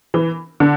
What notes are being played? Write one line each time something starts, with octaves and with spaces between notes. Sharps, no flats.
E3
D3